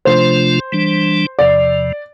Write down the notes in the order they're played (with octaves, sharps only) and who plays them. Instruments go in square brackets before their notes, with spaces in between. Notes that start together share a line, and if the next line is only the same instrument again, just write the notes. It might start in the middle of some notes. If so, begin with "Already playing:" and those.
[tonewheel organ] C3 F3 A3 D4 F4 [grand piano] C5
[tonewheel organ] E3 G3 D4
[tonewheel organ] E2 C3 F3 [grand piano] D5